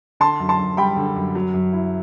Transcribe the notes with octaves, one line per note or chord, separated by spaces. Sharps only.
D3 A5 C6
F#2
A5 C6
F#2
G3 G5 B5
D3
F#2
F#3
F#2
E4